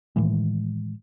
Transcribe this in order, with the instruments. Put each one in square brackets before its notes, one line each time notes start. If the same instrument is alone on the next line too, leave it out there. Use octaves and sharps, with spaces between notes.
[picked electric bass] A2 D#3 E3 G#3